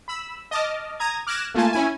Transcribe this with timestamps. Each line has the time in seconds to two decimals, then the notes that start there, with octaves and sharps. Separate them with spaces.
0.08 B5 E6
0.51 D#5 A5 D6 F6
1.00 A#5 D#6 G#6
1.27 D6 F6 F#6 G#6 A#6 E7
1.54 A3 A#3 F4 G#5 A5
1.73 C#4 E4 G#5